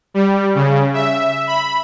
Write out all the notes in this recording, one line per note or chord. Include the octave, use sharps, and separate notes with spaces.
G3
C#3
E5
B5